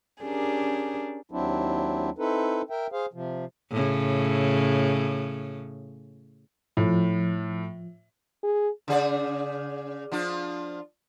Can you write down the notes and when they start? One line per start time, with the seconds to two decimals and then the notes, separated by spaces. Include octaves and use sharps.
0.24 C#4 D4 G4 G#4 A#4
1.31 D#2 F#3 C4 D4 E4
2.18 C4 D#4 E4 A4 B4
2.70 A#4 E5 G5
2.92 G#4 C5 F5
3.13 C3 F3
3.71 A2 C#3
6.77 A2 F3
8.43 G#4
8.88 C#3 G#4 D5
10.12 F3 D4 F4